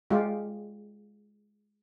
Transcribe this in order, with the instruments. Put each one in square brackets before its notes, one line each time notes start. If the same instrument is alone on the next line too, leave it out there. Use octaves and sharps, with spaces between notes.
[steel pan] G#3 F4 G4